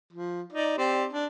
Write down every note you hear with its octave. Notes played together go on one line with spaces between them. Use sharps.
F3
D#4 D5
C4 G4 D5
D4